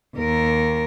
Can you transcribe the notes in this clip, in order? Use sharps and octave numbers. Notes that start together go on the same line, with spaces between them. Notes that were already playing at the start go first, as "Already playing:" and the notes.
D#2 A#4